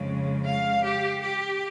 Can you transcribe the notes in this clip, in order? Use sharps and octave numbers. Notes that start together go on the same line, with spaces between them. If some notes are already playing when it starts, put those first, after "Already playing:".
Already playing: F2 C#3 G#3
F5
G4
G4